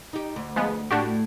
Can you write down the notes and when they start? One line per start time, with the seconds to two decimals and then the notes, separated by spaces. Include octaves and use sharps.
0.13 D#4 G4
0.36 D2
0.56 F3 G#3 B3
0.91 A2 A3 D4 F#4 G4